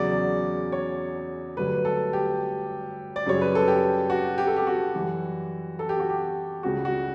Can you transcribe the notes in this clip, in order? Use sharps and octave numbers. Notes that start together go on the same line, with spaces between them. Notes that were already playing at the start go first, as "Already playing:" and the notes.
Already playing: E2 C#3 F#3 D5
C#5
G1 G2 F#3 A3 B4
A4
G4
D5
F#2 C#3 G3 C#5
B4
A4
G4
F#4
G4
A4
G4
F#4
F#2 E3 G3
A4
G4
F#4
G4
C#2 C#3 G3 F#4
F#4